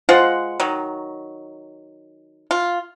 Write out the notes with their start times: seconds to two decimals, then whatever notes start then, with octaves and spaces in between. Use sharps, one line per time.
0.09 G#3 F4 C5 F#5
0.60 D#3 F#3
2.51 F4